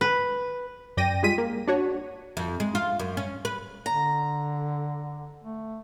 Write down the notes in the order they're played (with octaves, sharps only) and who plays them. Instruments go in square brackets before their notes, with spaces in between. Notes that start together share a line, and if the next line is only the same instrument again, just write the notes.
[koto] B4
[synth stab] F#2 D5 G5 A#6 D#7
G3 G#3 F4 B6 D#7
A#3
D4 F#4 C#5
[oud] F2
G#3
F4
F#2
C#4
B4
[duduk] D3 [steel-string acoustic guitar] A#5
[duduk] A3